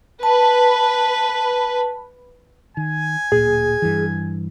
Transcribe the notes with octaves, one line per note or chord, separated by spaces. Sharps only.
B4 A5
D#3 G#5
D1 A#2 G#4
G2 E3